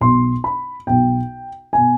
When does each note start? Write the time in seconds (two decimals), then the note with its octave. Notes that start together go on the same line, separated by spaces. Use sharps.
0.01 B1 B2 C6
0.44 B5
0.87 B1 B2 G5
1.73 B2 G#5